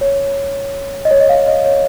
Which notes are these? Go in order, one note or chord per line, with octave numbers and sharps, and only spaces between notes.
C#5
D#5
C#5
D#5
F5
D#5
C#5